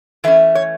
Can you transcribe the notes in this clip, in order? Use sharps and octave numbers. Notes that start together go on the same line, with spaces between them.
E3 A3 C#4 E5
C#5